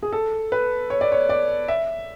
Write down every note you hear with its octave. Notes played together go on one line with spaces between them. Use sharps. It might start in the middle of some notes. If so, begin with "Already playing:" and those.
G#4
A4
B4
C#5
D5
C#5
D5
E5